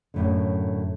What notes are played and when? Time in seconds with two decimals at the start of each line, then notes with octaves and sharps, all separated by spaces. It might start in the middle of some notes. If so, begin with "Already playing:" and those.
0.14 F#2 A2 D3